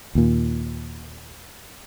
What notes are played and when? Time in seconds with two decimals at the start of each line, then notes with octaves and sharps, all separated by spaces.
0.15 D#2 A#2